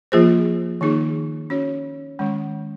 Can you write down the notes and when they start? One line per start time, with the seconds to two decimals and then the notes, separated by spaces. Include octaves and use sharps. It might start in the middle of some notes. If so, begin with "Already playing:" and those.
0.12 F3 A#3 F4 G#4 C5
0.81 D#3 A#3 D#4 G#4
1.50 C#4 F#4 C#5
2.19 D#3 G#3 C#4